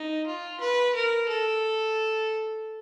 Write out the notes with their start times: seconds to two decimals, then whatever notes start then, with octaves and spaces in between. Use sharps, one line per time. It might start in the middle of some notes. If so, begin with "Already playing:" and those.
Already playing: D#4
0.27 F4
0.60 B4
0.95 A#4
1.28 A4